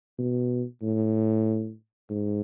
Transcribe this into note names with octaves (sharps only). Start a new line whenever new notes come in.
B2
A2
G#2